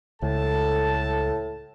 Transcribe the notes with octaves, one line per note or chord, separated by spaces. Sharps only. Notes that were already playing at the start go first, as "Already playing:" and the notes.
C#2 A2 A4 A5